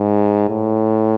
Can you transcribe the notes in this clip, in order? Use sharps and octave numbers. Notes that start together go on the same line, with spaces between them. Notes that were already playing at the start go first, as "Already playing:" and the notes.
Already playing: G#2
A2